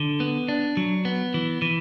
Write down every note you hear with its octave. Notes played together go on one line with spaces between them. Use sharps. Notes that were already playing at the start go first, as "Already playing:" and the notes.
Already playing: D3
B3
D4
F#3
B3
E3
E3